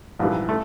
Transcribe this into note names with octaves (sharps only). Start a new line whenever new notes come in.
A#1 G#2 E3 G3
A3